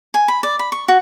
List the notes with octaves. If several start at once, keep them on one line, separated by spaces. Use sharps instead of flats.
G#5
B5
D5
B5
C#6
F#4